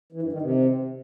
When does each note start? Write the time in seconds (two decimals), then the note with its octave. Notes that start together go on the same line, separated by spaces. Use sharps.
0.12 E3
0.22 G2
0.32 D#3
0.42 C3